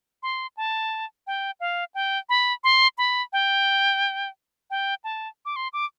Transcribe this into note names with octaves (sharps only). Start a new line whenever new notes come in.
C6
A5
G5
F5
G5
B5
C6
B5
G5
G5
A5
D6
C6
D6